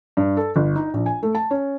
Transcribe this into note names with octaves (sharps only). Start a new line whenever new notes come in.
G2
A4
G1
D#4
A#1
G#5
A3
A5
C#4